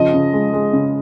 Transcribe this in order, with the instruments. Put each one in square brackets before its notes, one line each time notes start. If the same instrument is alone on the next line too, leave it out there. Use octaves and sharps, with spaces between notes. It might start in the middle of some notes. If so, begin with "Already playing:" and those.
Already playing: [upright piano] C#3 F3 D#5
C#3
G#3
G#3
C#3